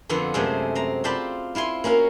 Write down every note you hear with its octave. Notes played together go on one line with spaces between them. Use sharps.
F2 D3 B3 F4
F#2 C3 G#3 A3 C5
C4 A#5
C4 F4 D5 G5 A5 B5
E4 F4 G#5 C6
A#3 C#4 F#4 F5